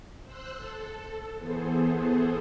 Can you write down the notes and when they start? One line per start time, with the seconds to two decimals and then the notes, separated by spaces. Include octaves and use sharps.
0.23 C5 E6 F#6
0.56 A4
1.39 E3 B3 G#4 A4 C5